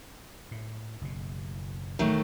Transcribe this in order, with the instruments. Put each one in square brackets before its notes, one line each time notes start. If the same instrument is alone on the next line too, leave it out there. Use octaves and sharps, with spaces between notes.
[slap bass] A2
F#1 B2
[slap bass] E1 A1 [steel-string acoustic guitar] D#3 F#3 A3